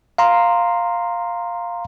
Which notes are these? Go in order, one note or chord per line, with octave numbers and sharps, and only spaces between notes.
F5 A#5 C6